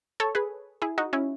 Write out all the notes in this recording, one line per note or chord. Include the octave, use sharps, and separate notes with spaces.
A4 C#5
G#4 B4
E4 G#4
D#4 F#4
C#4 E4